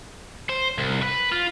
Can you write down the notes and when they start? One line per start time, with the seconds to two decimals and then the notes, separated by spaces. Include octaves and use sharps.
0.50 C5
0.78 C2
1.02 B4
1.32 F4